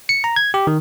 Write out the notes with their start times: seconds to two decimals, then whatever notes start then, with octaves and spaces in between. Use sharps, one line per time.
0.09 C#7
0.24 A#5
0.36 G#6
0.54 G4
0.67 D#3